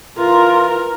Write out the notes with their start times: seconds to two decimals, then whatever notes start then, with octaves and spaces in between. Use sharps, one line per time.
0.18 E3 F4 A#4